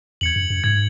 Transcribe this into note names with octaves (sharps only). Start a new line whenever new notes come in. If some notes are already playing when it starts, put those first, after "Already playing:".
E2 G#6 C#7 F#7
F#2
F#2
G#2 G#6 C#7 F#7